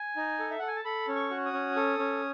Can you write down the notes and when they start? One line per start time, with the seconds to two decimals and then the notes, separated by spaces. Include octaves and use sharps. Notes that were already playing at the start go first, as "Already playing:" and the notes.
Already playing: G#5
0.16 D#4
0.39 A4
0.50 E5
0.59 A4 F#5
0.68 G#5
0.76 A5
0.84 A4 B5
1.08 C#4
1.15 C#6
1.30 F#4
1.46 D#6
1.53 C#4
1.76 A4
1.99 C#4